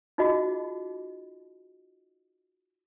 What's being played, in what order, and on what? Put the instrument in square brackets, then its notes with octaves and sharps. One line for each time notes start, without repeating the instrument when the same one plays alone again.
[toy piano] D#4 F4 F#4 G#4 D#5